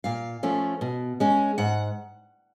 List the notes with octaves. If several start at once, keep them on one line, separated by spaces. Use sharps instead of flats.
A#2 F5
F3 A3 C#4
B2
G#3 C#4
G#2 F#5